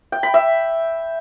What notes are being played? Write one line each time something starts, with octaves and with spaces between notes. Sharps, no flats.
G5
B5
E5